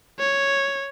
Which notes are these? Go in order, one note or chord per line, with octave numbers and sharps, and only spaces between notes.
C#5